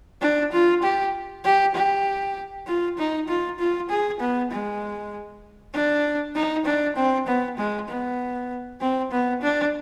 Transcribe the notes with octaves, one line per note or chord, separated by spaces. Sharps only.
D4
F4
G4
G4
G4
F4
D#4
F4
F4
G#4
B3
G#3
D4
D#4
D4
C4
B3
G#3
B3
C4
B3
D4